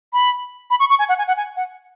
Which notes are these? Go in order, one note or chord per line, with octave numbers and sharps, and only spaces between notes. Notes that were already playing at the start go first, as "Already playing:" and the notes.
B5
B5
C#6
C#6
G#5
F#5
G#5
F#5
G#5
F#5